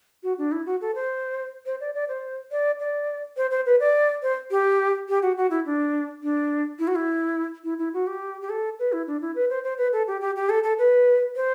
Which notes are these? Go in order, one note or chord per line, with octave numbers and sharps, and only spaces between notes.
F#4
D4
E4
F#4
A4
C5
C5
D5
D5
C5
D5
D5
C5
C5
B4
D5
C5
G4
G4
F#4
F#4
E4
D4
D4
E4
F#4
E4
E4
E4
F#4
G4
G4
A4
B4
E4
D4
E4
B4
C5
C5
B4
A4
G4
G4
G4
A4
A4
B4
C5